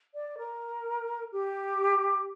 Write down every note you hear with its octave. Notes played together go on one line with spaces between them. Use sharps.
D5
A#4
G4